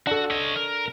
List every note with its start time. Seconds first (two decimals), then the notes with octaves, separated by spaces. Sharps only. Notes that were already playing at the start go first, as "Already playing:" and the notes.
0.07 D4 F#4 A4
0.31 C#5 D#5
0.56 A#4